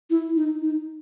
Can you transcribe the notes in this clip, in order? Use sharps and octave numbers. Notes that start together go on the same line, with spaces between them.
E4
D#4
D#4